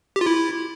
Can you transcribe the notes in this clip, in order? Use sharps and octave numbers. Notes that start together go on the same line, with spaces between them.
G4
F4
E4